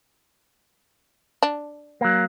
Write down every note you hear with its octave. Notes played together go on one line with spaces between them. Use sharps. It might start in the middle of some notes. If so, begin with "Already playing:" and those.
D4
F#3 A#3